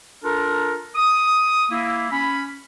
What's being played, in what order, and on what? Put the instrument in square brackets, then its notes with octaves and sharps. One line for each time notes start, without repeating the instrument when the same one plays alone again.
[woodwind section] D4 F4 A4 A#4
D#6
A#3 E4
C#4 B5